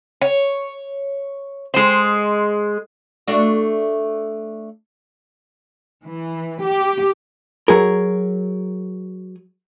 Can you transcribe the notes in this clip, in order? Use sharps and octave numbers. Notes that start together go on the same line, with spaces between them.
C#5
G#3 C5
A3 D4 F#4
E3
G4
F#3 G#4 A#4